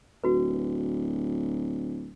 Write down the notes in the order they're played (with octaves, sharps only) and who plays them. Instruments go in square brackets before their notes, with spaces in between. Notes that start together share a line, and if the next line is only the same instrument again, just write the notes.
[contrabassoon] D1 [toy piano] F#4 B4